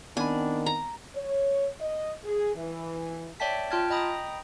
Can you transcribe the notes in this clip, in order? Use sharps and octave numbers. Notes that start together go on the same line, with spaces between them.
D#3 B3 C4 D4 G#5 B5
A#5
C#5
D#5
G#4
E3
C#5 D5 E5 G5 A5 B6
F4 G5 A5 F6 G#6 A6
D#5 G5 A#5 B5 D#6